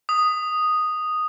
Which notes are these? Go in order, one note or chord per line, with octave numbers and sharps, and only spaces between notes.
D#6